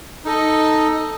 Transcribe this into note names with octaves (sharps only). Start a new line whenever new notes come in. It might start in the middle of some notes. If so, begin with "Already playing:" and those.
D#4 A4 D#5